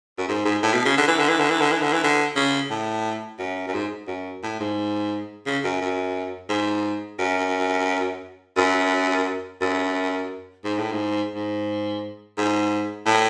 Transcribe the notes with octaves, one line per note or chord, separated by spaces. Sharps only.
F#2
G#2
G#2
A2
B2
C#3
D3
E3
D3
E3
D3
E3
D3
E3
D3
E3
D3
C#3
A2
F#2
F#2
G#2
F#2
A2
G#2
C#3
F#2
F#2
G#2
F#2
F#2
F#2
G#2
A2
G#2
G#2
G#2
A2